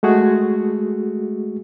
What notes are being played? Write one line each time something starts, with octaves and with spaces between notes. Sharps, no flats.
G#3 A3 F#4 G#4